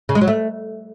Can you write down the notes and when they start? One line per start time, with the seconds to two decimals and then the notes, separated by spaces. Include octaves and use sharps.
0.09 C#3
0.15 G#3
0.21 F#3
0.28 A3